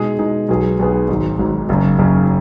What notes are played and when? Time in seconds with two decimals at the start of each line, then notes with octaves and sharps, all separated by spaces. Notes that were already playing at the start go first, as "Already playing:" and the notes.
Already playing: B2 G#3 D#4 G#4
0.19 B2 G#3 D#4 G#4
0.49 B1 B2 F#3 B3 G#4
0.79 B1 B2 F#3 B3 G#4
1.08 G#1 G#2 F#3
1.39 G#1 G#2 F#3
1.69 F#1 F#2 C#3
1.98 F#1 F#2 C#3